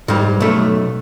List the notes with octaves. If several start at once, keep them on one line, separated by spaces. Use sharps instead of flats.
G#2 G3
B1 A3